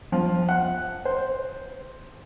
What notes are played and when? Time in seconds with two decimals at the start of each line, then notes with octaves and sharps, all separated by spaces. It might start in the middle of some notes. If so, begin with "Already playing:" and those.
0.12 F3
0.49 F#5
1.05 C5